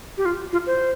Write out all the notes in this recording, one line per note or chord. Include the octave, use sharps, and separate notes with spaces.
G4
F4
F4
C5